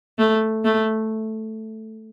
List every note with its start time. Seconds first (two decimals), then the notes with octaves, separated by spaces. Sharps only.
0.19 A3
0.65 A3